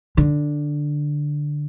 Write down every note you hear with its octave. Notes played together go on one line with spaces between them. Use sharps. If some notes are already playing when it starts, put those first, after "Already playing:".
D3